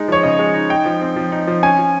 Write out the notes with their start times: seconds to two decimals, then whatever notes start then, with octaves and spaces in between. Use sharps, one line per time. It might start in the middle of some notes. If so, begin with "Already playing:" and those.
Already playing: G#3 D#4
0.08 F3 C#5
0.23 C#3 D#5
0.39 G#3
0.54 D#4
0.70 D#4 G5
0.85 F3
1.01 C4
1.16 F3
1.32 D#4
1.47 F3
1.63 C#4 G#5
1.79 F3